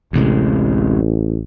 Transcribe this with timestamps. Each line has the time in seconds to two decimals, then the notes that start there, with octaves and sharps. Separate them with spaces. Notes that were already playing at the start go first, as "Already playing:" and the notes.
0.13 A1 D2 C3 G#3